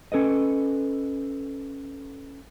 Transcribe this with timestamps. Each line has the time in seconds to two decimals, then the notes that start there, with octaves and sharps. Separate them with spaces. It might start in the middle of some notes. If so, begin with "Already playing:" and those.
0.12 C#4 A4 B4 D#5